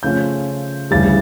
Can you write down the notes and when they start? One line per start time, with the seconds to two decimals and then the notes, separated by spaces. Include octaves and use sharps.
0.03 C#3 F3 A3 C#4 F4 G6
0.91 D2 C#3 E3 G3 A6